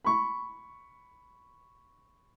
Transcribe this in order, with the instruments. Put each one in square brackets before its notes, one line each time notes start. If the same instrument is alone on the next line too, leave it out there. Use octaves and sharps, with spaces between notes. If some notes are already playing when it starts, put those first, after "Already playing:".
[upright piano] B5 C#6